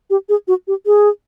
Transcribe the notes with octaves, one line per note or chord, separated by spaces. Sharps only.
G4
G#4
F#4
G4
G#4